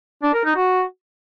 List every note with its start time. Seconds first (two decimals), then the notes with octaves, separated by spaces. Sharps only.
0.23 D4
0.34 A#4
0.45 D#4
0.56 F#4